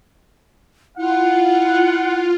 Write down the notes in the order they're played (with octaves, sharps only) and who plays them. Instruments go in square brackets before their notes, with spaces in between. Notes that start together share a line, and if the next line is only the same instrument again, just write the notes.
[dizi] E4 [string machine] F4 [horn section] F#5